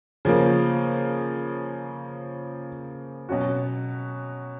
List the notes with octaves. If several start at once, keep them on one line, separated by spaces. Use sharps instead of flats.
C#3 F3 A#3
B2 F#3 C#4 F#4